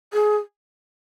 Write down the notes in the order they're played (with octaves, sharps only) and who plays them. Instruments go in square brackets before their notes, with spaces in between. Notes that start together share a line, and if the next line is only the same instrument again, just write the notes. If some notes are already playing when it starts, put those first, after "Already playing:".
[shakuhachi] G#4